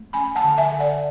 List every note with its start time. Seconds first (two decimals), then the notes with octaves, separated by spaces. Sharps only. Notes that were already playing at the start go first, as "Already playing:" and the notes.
Already playing: A3
0.13 C#4 G#5 B5
0.35 F#5 A5
0.44 D3
0.58 E5 G#5
0.72 D3
0.80 D5 F#5